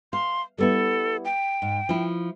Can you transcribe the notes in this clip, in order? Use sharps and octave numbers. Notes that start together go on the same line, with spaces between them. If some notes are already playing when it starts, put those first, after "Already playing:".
F5 C6
G3 B3 E4 A4
G5
G#2
F3 E4